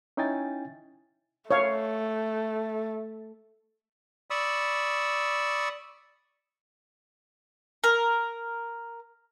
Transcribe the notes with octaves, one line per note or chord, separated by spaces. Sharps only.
C#4 D#4 E4 G5 G#5 A6
A3 C#5 F5
D5 B5 C#6 D#6 E6
A#4